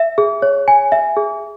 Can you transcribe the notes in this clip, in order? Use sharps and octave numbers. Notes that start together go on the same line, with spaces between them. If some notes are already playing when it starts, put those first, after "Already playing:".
Already playing: E5
G#4
C#5
G#5
E5
G#4